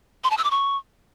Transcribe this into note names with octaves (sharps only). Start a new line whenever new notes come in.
C6
A5
E6
D6
C#6